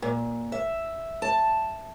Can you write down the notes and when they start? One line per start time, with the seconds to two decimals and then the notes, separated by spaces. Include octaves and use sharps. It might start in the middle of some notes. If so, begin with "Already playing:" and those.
0.02 A#2
0.52 E5
1.22 A5